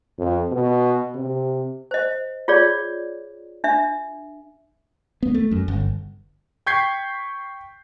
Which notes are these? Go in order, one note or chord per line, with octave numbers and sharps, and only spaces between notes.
F2
B2
C3
C5 D#5
F4 G#4 C#5 D5
D4 E5
B3
A3
F#2
G1
G5 C#6 G6 G#6 B6 C7